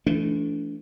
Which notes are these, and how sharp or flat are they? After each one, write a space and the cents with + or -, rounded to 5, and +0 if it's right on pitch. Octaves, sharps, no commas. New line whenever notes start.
E3 +25 A3 -15 D4 -30